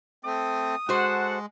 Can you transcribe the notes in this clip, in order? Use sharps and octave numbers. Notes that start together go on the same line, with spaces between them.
A3 C4 D#6
G#3 F#4 A4 C5 F#5